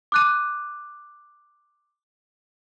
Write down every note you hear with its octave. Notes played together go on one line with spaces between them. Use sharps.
D6 F#6 D#7